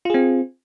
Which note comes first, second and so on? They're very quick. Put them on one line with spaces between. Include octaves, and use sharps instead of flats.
F4 G#4 C4